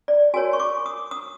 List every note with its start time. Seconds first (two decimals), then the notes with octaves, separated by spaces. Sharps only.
0.08 D5
0.34 F#4 A#4 C#5 G#5
0.53 C#6
0.60 D6
0.86 D#6
1.11 D#6